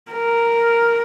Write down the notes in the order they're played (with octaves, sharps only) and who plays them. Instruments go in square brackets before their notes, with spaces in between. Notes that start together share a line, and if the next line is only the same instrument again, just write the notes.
[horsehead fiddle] A#4